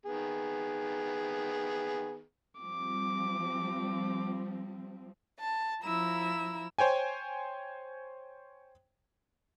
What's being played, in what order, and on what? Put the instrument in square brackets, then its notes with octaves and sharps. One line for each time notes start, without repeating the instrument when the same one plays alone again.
[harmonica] D#3 B3 G#4
[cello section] F3 G3 C4 [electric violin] D6
[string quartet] A5
F3 E4 A#5 E6
[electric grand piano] C5 C#5 G5 G#5